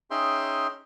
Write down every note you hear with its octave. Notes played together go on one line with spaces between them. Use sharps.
C#4 D#4 G#4 E5 G5 C6